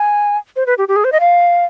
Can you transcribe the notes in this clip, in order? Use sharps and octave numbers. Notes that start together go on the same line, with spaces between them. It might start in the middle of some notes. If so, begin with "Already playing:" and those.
Already playing: G#5
C5
B4
G4
G4
G#4
C5
D#5
F5